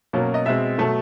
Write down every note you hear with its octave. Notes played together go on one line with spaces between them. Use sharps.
B2 F#3 A#3 C#4
D#5
B2 G#3 C4 E5
B2 F#3 A3